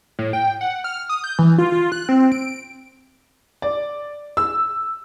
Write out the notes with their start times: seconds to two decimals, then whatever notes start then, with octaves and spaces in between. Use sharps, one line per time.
0.19 A2
0.33 G5
0.61 F#5
0.84 F6
1.09 D#6
1.24 G6
1.39 E3
1.58 F4
1.72 F4
1.92 F#6
2.09 C4
2.32 D7
3.62 D5
4.37 E6